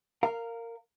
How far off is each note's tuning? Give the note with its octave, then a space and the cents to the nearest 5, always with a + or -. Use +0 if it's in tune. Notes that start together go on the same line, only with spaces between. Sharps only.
A#4 -15 F5 +0